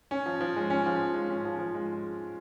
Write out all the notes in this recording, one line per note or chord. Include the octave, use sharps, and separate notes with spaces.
C#4
F3
F3
G#3
C#4
F3
F3
G#3
C#4
F3
F3
G#3